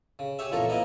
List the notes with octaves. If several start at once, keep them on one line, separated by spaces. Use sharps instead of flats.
C#3
G4 G#4 C#5 E5
A1 F2 A#2 A4 A#4 C#5
A#3 B3 E4 A#4 D#5